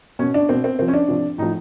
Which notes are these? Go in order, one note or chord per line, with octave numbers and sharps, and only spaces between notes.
B2 C#4
D4
B2 C4
C4
C3 F3 C4
C#4
D4
C3 F3
A2 F3 D#4